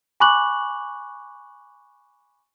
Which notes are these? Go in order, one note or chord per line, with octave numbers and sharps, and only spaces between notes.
G#5 B5 C#6 D6 F#6 F#7